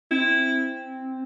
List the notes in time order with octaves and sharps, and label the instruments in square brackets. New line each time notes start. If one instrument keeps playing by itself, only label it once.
[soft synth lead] C4 [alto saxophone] E4